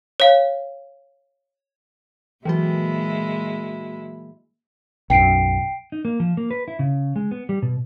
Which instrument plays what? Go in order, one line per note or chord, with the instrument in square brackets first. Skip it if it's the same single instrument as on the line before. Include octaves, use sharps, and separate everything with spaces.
[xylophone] C#5 F5
[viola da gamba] A#2 G#3 E4 [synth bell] E3 F#3 F#4
[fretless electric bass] B1 F#2 [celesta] G5 C7 D7
[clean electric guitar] D#4
A#3
F3
A#3
B4
E4
C#3
G#3
B3
G3
B2